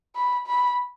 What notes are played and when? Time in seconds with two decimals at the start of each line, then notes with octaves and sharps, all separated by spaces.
0.16 B5
0.47 B5